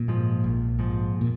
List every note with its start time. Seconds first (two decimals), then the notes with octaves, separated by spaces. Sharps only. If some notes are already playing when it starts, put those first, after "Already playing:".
Already playing: A#2
0.08 G#2 F3
0.44 A#1
0.79 G#2 F3
1.21 A#2